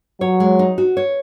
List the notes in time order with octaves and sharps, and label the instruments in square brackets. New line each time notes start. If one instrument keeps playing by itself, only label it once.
[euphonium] F#3 [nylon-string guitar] C#5
[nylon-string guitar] G#3
D#4
F#4
C#5